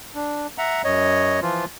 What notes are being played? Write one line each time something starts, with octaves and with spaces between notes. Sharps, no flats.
D4
E5 F#5 A#5
F#2 C#5 D#5
E3 F3 F4